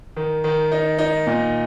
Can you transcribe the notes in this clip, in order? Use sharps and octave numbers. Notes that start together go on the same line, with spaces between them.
D#3
D#3
D#4
D#4
A#2